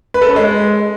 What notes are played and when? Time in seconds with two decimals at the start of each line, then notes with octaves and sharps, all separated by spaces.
0.14 B4
0.22 A4
0.29 C#4
0.36 G#3